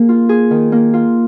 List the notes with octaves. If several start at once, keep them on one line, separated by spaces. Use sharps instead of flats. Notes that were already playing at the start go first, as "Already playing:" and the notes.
Already playing: A#3 G#4
F4
G#4
D#3
A#3
F4